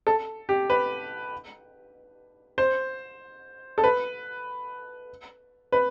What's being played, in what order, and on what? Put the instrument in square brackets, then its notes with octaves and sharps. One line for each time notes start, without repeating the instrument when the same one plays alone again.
[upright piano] A4
G4
B4
C5
A4
B4
B4